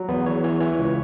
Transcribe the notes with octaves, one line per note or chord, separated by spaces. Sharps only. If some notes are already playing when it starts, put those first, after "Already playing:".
Already playing: F#3
E2 B3
E2 C#5
E3 C#5
E3 C#5
C#2